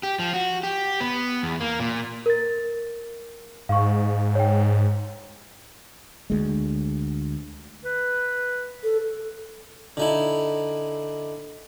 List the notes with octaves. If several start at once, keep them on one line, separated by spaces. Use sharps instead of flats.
G4
F3
F#4
G4
B3
E2
A#3
A#2
A#4 A6
G#2 F5 C#6
C#5 G5
D2 G#3
B4
A4
D3 D#4 E4